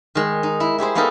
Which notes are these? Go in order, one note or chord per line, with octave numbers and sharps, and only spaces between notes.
D#3 G#3
D#4
E4
E4 G4 G#4 C5
A#3 B3 D#4 G4 A4 A#4